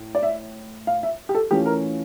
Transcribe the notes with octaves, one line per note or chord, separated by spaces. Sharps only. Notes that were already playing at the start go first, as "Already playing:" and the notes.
Already playing: A2
D5
E5
F5
E5
G4
A4
E3 A3 C#4 F4 G4
A#4